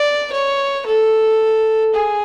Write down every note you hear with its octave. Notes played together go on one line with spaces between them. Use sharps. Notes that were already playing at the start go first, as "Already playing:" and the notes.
Already playing: D5
C#5
A4
G#4